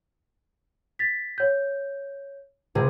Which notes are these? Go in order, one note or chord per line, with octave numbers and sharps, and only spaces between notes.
A6 B6
C#5 G6
C#2 C3 G#4